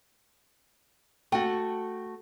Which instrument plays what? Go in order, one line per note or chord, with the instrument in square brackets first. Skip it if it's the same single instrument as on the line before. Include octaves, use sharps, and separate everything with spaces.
[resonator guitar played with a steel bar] A3 F#4 [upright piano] G5